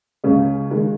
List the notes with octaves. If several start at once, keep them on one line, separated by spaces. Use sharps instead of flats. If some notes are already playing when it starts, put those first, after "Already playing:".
C#2 C#3 G#3 C#4
D#3 G#3